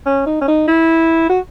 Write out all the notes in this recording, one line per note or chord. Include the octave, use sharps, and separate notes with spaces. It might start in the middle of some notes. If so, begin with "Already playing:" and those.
C#4
D#4
C#4
D#4
E4
F#4